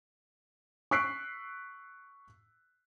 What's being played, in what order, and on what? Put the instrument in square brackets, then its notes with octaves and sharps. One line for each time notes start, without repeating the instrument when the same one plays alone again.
[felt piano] C#6 E6 F#6 B6 C7 D7